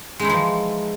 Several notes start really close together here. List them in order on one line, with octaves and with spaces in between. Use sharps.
G#3 D#4 E4 E3 F3